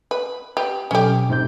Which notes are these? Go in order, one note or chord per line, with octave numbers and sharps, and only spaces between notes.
B4
G4 B4
B2 F#3 C#4 G4 A4
G#2 C3 G6